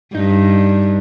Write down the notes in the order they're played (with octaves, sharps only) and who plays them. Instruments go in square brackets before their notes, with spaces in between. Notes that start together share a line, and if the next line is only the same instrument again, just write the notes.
[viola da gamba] G2 [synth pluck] D#4